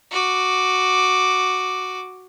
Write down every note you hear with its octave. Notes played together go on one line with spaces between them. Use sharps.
F#4 D6